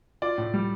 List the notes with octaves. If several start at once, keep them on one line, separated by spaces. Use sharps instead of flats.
F4 D5
A2
G3